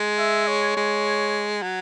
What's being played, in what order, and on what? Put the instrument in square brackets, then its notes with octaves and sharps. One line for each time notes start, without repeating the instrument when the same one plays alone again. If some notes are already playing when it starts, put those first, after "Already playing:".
Already playing: [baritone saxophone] G#3
[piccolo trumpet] E5
C#5
[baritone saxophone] G#3
F#3